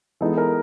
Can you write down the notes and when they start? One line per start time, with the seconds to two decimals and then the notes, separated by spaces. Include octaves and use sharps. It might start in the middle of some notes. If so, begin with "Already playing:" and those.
0.21 E3 G#3 B3 D#4 A4
0.38 A#4